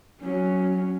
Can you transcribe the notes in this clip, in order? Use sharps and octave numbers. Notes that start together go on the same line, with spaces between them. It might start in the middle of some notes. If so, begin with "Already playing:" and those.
F#3 C#4